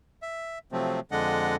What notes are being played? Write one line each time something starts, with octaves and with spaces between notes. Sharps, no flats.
E5
C3 F3 F#3 A3 C4
F2 D3 G#3 D4 D#5 F#5